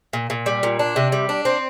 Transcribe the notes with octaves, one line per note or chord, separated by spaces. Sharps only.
A#2
A#2
G3
A#2
D4
C3
G3
D4
C4